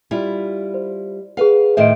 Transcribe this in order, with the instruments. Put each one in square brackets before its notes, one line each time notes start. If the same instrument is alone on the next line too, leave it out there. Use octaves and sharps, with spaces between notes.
[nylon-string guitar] G3 E4 F4
[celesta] C5
[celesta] G#4 F#5 [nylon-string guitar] B4 F5
[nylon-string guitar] A2 D#3 C5 [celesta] E5 D7